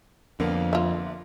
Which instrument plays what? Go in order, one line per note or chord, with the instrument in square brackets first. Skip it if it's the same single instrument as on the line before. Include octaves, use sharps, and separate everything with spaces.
[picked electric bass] F2 [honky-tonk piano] D3 A#3 B3
[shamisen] F4 E5